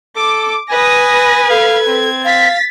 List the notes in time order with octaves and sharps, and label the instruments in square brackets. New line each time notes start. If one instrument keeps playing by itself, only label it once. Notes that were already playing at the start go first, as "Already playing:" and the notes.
[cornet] A4 [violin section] D6
[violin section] B4 [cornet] G#5 [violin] D#6 A#6
[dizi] A4 [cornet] F5 [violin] G#6
[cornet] C4
[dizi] F5 [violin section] A6 B6